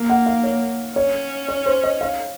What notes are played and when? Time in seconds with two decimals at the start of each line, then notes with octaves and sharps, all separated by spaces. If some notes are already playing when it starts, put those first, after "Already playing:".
Already playing: A#3
0.10 F#5
0.26 F5
0.44 C#5
0.96 C#4 C#5
1.48 C#5
1.66 C5
1.84 D#5
2.01 F5